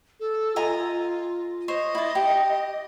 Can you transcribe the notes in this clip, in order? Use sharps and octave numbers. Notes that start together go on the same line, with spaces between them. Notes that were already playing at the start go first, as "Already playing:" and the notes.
A4
F4 D#5 G#5 A#5
C5 C#5 D#5
E4 D5
G4